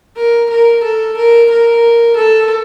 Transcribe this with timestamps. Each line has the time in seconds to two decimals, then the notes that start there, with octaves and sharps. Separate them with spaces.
0.16 A#4
0.50 A#4
0.83 A4
1.17 A#4
1.50 A#4
2.16 A4